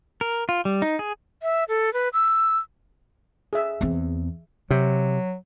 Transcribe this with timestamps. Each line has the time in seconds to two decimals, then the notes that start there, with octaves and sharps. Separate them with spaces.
0.21 A#4
0.49 F4
0.65 G3
0.82 D#4
0.99 G#4
1.43 E5
1.69 A4
1.93 B4
2.13 E6
3.53 G#4 E5
3.81 E2 C4
4.71 C3 F#3